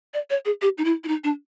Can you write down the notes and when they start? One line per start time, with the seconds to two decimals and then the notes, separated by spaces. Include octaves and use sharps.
0.14 D5
0.30 C#5
0.45 G#4
0.62 G4
0.78 D#4
0.85 E4
1.04 E4
1.08 D#4
1.24 D4